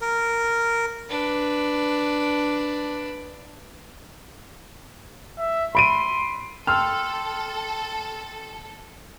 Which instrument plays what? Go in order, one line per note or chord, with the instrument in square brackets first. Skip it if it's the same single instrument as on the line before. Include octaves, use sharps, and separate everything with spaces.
[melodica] A#4
[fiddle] D4 B4
[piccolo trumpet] E5
[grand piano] B5 D7 D#7 [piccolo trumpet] C6
[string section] A4 [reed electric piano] G5 C6 E6 [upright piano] F6